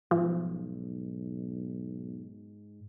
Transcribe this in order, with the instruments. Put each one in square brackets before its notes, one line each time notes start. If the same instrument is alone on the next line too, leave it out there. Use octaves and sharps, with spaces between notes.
[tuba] B1 [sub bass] G#2 [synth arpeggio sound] F3